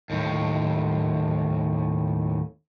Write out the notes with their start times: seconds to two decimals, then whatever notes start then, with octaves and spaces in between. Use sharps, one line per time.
0.10 D#2 A2